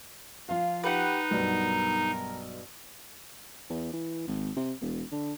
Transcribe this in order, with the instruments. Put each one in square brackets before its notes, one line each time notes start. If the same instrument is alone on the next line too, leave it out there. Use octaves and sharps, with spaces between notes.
[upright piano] F3 F5 [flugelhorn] F4
[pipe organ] D#4 [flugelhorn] G4 [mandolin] B4 F#5
[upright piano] B1 G2 B3 [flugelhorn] A#4
[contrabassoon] E2
E3
G#1
C3
E1
D3